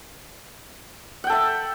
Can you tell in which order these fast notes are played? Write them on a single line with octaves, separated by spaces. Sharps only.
F#5 G5 A4 E5